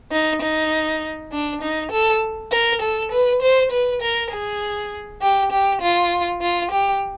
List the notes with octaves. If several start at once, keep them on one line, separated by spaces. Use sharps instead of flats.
D#4
D#4
D4
D#4
A4
A#4
A4
B4
C5
B4
A#4
G#4
G4
G4
F4
F4
G4